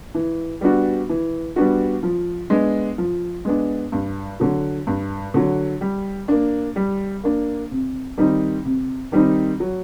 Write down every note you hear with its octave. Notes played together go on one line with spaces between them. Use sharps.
E3
G3 B3 D4 F#4
E3
G3 B3 D4 F#4
F3
G#3 B3 D4
F3
G#3 B3 D4
G2
D3 F#3
G2
D3 F#3
G3
A#3 D4
G3
A#3 D4
C3
D#3 G3 C4 D#4
C3
D#3 G3 C4 D#4
F#3